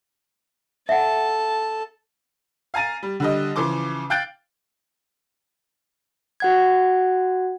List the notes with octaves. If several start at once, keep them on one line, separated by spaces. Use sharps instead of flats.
A4 E5 F#5 A5
F5 G#5 A#5 A6 D#7
G3
D3 G3 D#5
C#3 E3 F3 C6 D6
F5 G5 F#6 G6 A6 D7
F#4 F#5 G#6